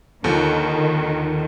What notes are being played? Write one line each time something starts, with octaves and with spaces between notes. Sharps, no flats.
D#2 D3 D#3 F3